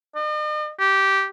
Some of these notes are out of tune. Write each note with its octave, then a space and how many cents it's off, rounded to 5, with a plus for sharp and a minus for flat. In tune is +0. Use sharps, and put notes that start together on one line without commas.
D#5 -45
G4 -10